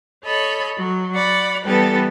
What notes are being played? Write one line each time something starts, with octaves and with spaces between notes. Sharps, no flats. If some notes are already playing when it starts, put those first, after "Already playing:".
A4 C#5 D#5 B5
F#3
D5 F#5 B5
E3 G3 B3 G4 A4 B4